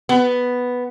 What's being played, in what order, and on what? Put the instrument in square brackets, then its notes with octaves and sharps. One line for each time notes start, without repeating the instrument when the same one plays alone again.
[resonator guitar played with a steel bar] B3